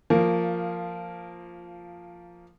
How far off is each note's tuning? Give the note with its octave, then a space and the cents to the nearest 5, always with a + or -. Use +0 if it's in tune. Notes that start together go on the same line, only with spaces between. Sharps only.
F3 +0 A#3 -15